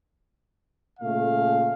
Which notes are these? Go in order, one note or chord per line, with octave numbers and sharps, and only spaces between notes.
A#2 C#3 A3 F5